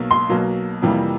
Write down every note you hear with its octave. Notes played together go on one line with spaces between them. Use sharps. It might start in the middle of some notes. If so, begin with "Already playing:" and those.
Already playing: B1 B2 F#3 A#3
C6
B1 B2 F#3 A#3
F2 C3 E3 G3 A#3